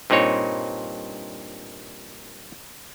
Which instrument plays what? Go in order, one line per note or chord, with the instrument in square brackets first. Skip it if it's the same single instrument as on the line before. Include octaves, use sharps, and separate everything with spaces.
[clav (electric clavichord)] G2 A#2 C4 D#4 C#5